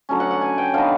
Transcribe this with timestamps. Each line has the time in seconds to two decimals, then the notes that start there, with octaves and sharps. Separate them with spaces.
0.09 D3 F#3 A3 C#4
0.20 F#5
0.31 F#5
0.41 G#5
0.58 G5
0.74 D3 F#3 B3 D#4 F5